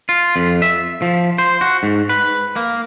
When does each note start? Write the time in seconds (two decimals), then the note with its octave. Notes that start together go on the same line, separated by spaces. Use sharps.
0.09 F4
0.36 F2
0.62 E5
1.02 F3
1.38 C5
1.61 F#4
1.83 G#2
2.09 B4
2.56 A#3